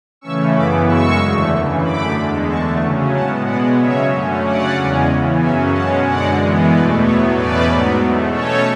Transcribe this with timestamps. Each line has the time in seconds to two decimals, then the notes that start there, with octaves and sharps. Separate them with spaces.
0.21 C#3 E3 A3 C#4 C#6 E6
0.54 F#2 C#3 E3 B3 B5 D6
0.86 F#2 C#3 G#3 C#6 E6
1.19 E2 D3 A3
1.51 F#2 C#3 E3
1.83 F#2 D3 A3 B5 D6
2.15 E2 D3 G#3
2.48 E2 D3 A3 A5 C#6
2.81 C#3 F#3 C#4
3.13 A2 G#3 B3 F#5 A5
3.45 B2 G#3 B3 D5 F#5
3.78 C#3 F#3 C#4 C#5 E5
4.10 F#2 D3 A3 C#4
4.42 C#3 F#3 C#4 D5 F#5
4.75 E2 C#3 G#3 C#4
5.07 C#3 E3 B3
5.39 F#2 C#3 F#3 C#4 E5 G#5
5.72 B2 G#3 C#4 F#5 A5
6.04 F#2 D3 G#3 D5 F#5
6.36 F#2 E3 G#3 B3
6.69 E2 B2 A3 B4 D5
7.01 A2 F#3 B3 A4 C#5
7.34 E2 B2 A3 C#4 B4 D5
7.66 G#2 F#3 B3
7.99 E2 B2 A3
8.31 B2 A3 C#4 A4 C#5